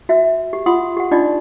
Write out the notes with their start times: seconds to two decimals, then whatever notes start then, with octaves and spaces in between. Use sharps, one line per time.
0.09 F#4 E5
0.53 G4
0.66 F4 F#5 C6 D#6
0.97 G4 F#5
1.11 D4 D#4 F4 D5 D#5